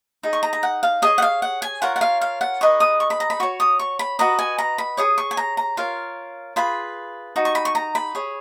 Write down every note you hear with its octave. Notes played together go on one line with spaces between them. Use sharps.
D#4 G#4
C#6
A#5
A#5
F#5
F5
G#4 C#5 D#5
F#5
F5
F#5
G#5
F4 A#4 C#5 F#5
F#5
F5
F5
F#5
D#4 G#4 B4 D#5 C#6
D#6
C#6
B5
A#5
B5
F#4 C#5 C#6
D#6
C#6
B5
F#4 B4 D#5 A#5
G#5
A#5
B5
G#4 C#5 D#6
C#6
G#5
A#5
A#5
F4 A#4 C#5 F5
F4 G#4 B4 B5
D#4 F#4
C#6
B5
C#6
A#5
B5
G#4 C#5